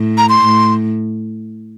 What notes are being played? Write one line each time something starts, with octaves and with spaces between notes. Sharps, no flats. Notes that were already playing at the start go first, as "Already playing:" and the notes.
Already playing: A2
A#5
C6
A2